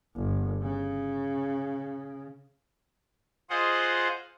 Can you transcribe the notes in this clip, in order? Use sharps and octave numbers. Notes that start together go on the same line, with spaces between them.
G1
C#3
F4 G#4 C5 D#5 F#5